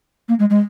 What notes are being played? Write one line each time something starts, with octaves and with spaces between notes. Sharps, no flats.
A#3
G#3
G#3